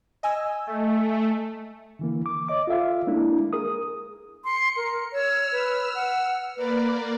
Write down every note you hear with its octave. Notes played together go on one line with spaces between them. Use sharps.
D#5 G#5 E6
A3
D3 E3 A#3
D6
C#5 D#5 D6
F4 A4 E5 F5
G#3 A#3 D4 E4
G#4 A#4 D#6
C6 C#7
A#4
C#5 E6 F6
B4
F#5
A#3 A#4 B4 D5